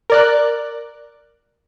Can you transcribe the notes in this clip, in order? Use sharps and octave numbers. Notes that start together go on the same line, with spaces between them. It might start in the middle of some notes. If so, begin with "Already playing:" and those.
A#4 D5 F#6